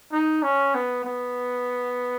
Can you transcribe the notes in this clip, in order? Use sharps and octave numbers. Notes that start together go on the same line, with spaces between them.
D#4
C#4
B3
B3